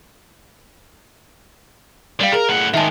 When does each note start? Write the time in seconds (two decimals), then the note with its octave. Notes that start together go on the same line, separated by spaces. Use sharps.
2.20 G3 D5 F5
2.32 G#4 A#4 F#7
2.49 A2 F#5
2.74 D#3 G#3 E5 A5